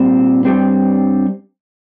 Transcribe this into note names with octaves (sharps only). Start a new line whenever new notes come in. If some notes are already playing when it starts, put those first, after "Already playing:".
Already playing: A#2 G3 C4
G2 G3 C4